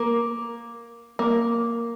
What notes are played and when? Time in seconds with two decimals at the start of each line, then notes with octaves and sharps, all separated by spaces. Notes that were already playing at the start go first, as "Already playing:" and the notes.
Already playing: A#3
1.19 A#3